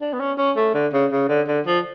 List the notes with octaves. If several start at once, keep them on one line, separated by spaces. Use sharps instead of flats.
D4
B3
C#4
C#4
A3
D3
C#3
C#3
D3
D3
F3